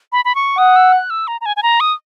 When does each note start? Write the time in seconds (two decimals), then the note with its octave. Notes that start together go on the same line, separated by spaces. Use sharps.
0.12 B5
0.25 B5
0.35 C#6
0.58 F#5 D#6
0.76 E6
0.93 F#6
1.10 E6
1.27 A#5
1.41 A#5
1.46 G#5
1.57 G#5
1.63 A#5
1.80 D#6